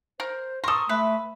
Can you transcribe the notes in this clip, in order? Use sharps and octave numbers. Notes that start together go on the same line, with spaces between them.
A#4 C5
A4 A#4 C6 C#6 D#6
A3 B4 E5